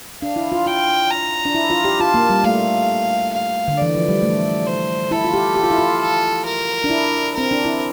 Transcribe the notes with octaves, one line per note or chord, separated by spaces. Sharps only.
D4 F5
E4
F4
F4 G5
A#5
D4
E4
F4
G4
F4 A5
A#3
G3
A3 F5
F5
D3
E3 D5
F3
G3
A3
C5
E4 A4
F4
G4
G4
F4
E4
F4
A4
A#4
D4
E4
C4 A#4
D4
E4